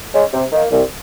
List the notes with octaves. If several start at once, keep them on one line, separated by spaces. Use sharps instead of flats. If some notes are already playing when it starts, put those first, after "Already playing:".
G#3 C#4
C3
D#3 A#3
C2